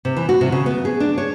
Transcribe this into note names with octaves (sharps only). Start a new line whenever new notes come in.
C3
E3
F#4
C3
C#3
B3
G#4
D4
C#5